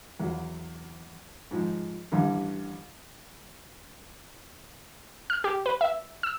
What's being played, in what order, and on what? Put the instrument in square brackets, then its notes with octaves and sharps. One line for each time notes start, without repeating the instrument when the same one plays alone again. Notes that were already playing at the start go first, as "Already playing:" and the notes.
[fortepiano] E2 F#3
G#2 F3
A1 G2
[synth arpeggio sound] F6
G4
B4
E5
E6